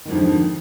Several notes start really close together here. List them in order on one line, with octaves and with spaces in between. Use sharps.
D#3 G#2 F2 D3 F3